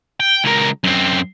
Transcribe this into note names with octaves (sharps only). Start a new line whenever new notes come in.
G5
C#2 A#4
F#2 C4